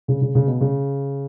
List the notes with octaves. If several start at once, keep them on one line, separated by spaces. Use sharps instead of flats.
C#3
C#3
C#3
B2
C#3